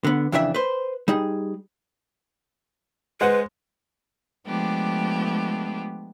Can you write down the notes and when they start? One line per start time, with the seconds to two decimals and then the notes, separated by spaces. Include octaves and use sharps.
0.04 D3 B3
0.32 F2 C#3 E3 D4 E4 E5
0.54 B4 C5
1.08 G3 D#4 G#4
3.21 G#3 B4 C5 F#5
4.47 F3 G#3 A3 B3 D4 G4